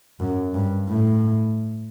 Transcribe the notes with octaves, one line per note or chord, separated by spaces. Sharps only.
F#2
G2
A2